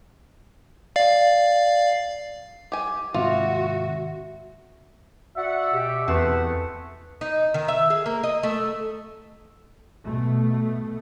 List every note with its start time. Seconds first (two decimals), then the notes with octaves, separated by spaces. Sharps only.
0.96 D5 F5
2.72 G4 G#5
3.14 D#2 G#2 C3 F4 F#4 E5
5.37 F#4 D5 E5 F#5
5.73 B2 G4
6.08 E2 A3 C4 B4 F#5 E7
7.21 D#4
7.54 D#3
7.68 E5
7.90 G#4
8.06 A#3
8.23 D#5
8.43 A3
10.03 B2 A3